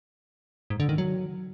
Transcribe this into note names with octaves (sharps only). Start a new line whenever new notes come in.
G#2
D3
D#3
F#3